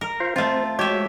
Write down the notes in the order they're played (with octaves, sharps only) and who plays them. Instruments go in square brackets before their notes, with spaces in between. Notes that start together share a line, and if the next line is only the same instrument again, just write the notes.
[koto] A#4
[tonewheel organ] F4 C5 F5
[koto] A3 F4 [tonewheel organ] C4 C5
[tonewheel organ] G#3 F#4 C#5 [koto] G4 E5